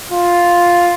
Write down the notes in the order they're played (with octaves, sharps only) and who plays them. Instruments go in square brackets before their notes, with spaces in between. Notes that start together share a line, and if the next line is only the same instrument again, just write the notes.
[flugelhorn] F4